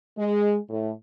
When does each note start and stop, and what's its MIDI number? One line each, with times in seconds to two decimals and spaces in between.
0.18 0.57 56
0.70 0.91 45